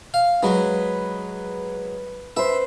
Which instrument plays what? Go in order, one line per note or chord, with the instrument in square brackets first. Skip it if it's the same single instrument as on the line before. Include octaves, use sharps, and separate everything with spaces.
[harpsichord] F5
[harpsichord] F#3 G#3 [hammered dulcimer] B4
[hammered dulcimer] B4 C5 [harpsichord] E5